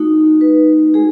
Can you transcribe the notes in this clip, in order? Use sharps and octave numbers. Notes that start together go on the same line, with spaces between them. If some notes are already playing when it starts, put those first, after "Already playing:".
Already playing: A3 D#4 F#4
B4
G#3 G#4